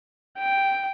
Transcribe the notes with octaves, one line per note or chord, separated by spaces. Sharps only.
G5